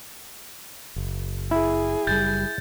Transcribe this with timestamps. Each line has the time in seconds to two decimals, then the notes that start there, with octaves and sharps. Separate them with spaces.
0.96 F#1
1.51 E4 G#4
2.07 F#1 G3 G6 A6